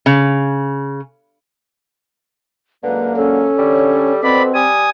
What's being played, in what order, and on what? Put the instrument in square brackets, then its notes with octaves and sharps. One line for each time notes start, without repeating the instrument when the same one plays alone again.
[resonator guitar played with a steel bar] C#3
[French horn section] F#2 G#3 A#3 [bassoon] D3 [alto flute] B4
[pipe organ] C#4 [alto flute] A4
[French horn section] D3 C#5 [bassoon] G3
[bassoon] B2 [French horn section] C4 [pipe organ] D5 B5
[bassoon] G3 [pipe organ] G#5 D#6